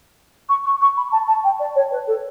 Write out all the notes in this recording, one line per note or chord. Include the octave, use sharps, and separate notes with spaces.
C#6
C#6
C#6
B5
A5
A5
G5
D5
C#5
B4
A4